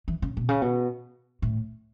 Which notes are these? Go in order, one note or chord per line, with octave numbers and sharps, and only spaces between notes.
E3
C#3
B2
C#3
B2
A2